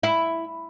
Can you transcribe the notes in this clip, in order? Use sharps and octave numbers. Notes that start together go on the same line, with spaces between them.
E4